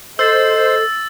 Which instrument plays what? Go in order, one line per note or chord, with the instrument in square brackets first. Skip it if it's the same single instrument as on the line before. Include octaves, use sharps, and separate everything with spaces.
[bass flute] A4 [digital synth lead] C5 [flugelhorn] D#5 [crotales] E6 A6